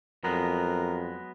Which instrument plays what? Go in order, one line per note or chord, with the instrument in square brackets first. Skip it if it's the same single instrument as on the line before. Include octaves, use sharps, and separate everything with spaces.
[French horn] F2 [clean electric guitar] F#3 G#3 B3 [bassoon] A#4